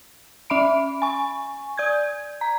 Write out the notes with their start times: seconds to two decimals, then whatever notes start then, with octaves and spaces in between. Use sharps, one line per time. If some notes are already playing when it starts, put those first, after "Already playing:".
0.50 C#4 E5 B5 D7
1.02 G#5 C#6
1.77 D5 G6 G#6
2.41 A#5